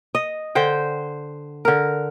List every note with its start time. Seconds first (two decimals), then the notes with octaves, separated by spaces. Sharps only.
0.15 D#5
0.55 D3 C5 G5
1.65 D3 A#4